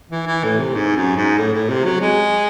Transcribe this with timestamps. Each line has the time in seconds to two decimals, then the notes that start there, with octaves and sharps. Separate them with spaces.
0.11 E3
0.27 E3
0.44 A2
0.59 C3
0.75 G#2
0.96 F#2
1.17 G#2
1.38 A2
1.53 A2
1.69 C3
1.85 F#3
2.01 G#3